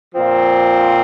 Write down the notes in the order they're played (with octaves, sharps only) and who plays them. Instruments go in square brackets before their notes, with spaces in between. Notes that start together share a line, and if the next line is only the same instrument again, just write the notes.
[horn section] A#2 F3 C4